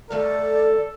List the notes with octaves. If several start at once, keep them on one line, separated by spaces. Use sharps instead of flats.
D#3 A3 A4 D5 F5